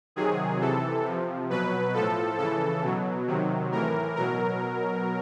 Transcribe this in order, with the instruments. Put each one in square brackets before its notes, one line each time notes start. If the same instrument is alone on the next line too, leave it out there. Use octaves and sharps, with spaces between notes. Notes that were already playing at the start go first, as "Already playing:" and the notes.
[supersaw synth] C3 D#3 F#3 G#4
C3 E3 A4
C3 F3
B2 F#3 B4
A2 F3 A4
C#3 E3 A4
B2 F#3
C3 D#3 F#3
A2 E3 A#4
B2 F#3 A#4